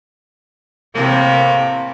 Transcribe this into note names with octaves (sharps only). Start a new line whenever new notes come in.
A2 C3 A#3